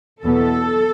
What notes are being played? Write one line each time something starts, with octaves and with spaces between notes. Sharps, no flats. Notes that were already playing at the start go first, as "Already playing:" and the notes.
E2 B2 B3 A4